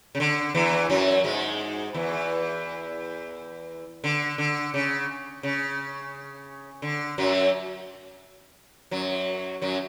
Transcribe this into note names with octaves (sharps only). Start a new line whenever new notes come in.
C#3
D3
E2 E3
F#2 F#3
G#2 G#3
E2 E3
D3
D3
C#3
C#3
D3
F#2 F#3
F#2 F#3
F#2 F#3